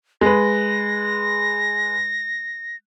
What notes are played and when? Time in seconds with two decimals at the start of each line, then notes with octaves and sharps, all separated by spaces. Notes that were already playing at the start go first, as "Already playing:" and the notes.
0.21 G#3 B4 A#6